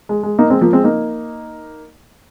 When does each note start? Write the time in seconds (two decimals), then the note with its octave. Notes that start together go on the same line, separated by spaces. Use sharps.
0.09 G#3
0.23 G#3
0.38 A#3 D#4
0.50 G#3 C4
0.61 F3 A#3
0.73 G#3 C4
0.84 A#3 D#4